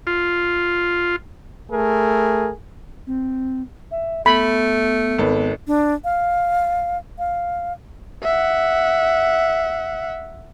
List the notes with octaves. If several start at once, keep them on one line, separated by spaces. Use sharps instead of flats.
F4
A3 G#4 A#4
C4
E5
A3 B3 B5
G#1 A4 B4
D4
F5
F5
E5 F#5